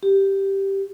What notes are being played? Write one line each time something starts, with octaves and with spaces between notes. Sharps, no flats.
G4